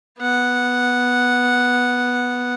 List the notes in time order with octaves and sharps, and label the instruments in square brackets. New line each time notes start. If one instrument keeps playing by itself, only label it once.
[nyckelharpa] B3 F#5